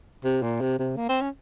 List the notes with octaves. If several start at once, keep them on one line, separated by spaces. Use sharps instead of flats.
C3
A#2
C3
C3
A#3
C4
C#4